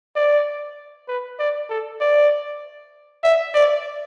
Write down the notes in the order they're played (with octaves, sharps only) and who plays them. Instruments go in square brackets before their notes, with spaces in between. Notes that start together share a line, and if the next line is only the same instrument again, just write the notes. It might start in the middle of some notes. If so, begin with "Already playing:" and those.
[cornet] D5
B4
D5
A4
D5
E5
D5